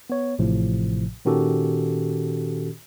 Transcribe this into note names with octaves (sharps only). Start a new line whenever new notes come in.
B3 C#5
A1 A2 C3 F3
A#2 D#3 C#4 F#4 G4 A4